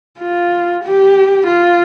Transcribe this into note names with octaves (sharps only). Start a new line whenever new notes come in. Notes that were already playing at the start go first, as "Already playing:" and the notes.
F4
G4
F4